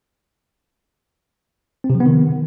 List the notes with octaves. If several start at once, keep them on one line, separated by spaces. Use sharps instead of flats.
C4
C3
F3
B3
D#3